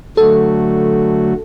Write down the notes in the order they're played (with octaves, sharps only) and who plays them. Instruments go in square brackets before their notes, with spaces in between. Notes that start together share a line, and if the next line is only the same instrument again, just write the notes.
[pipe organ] D3 F#3 A3 F#4 [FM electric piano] A4